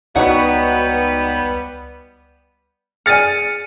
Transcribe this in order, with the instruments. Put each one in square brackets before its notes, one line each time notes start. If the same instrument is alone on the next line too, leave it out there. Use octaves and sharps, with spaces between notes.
[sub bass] C#2 [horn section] G3 B3 [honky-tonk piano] D#4 F#4 B4 [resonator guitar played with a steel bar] C#5 F#5
[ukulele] G#4 D5 G#5 [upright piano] F6 A6 [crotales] C#7 D#7